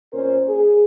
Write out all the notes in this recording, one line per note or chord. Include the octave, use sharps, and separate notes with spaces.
A#2 C#4 A#4 C5
G#4